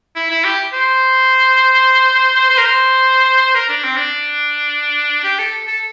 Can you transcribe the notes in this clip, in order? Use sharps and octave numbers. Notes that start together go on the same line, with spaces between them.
E4
E4
G4
C5
C5
A#4
C5
A#4
D4
C4
D4
G4
A4
A4